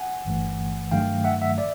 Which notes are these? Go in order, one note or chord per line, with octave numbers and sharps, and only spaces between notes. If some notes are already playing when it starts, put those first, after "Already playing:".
Already playing: F#5 G#5
G1 G2 E3 A3
G2 D#3 F#3 A3 F5 G5
E5 F#5
E5 F#5
D5 E5